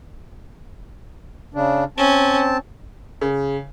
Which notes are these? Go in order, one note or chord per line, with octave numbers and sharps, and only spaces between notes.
C#3 D4
C4 C#4 A5
C#3